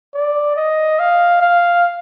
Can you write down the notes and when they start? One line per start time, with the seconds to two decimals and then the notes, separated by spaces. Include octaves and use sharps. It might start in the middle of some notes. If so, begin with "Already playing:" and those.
0.14 D5
0.56 D#5
0.99 F5
1.41 F5